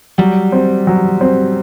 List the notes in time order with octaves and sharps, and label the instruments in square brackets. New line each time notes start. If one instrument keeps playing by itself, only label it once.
[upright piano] F#3 [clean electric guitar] G3
[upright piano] C4
F#3
C4